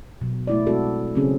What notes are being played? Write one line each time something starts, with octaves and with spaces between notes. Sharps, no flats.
B2 F#3
A3 E4 D5
G#3 C4 F#4 A4
C#3 F#3 C4 C#4 G#4